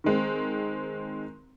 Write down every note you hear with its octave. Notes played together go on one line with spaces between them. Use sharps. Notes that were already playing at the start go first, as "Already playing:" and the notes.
D#3 G#3 C4